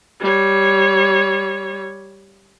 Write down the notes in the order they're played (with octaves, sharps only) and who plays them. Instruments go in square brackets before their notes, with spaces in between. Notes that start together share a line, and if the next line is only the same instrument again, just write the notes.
[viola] G3 C#5